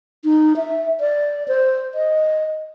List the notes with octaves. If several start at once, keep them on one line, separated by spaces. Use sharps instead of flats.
D#4
E5
D5
C5
D#5